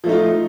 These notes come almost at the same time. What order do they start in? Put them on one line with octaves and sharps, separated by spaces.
F3 A3 D#4 F4